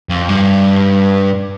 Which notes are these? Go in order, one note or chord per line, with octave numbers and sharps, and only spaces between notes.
F2
G2